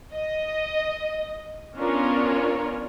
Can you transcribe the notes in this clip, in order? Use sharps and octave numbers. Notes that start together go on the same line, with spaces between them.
D#5
B3 C#4 D4 F4 A#4 C#5